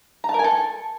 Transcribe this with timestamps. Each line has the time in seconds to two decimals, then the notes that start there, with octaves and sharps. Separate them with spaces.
0.24 A#5
0.29 A5
0.34 A#4
0.39 G#5
0.44 A4